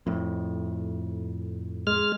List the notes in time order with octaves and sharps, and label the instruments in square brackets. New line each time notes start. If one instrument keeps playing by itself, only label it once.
[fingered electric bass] F2 A2
[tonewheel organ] G#3 F6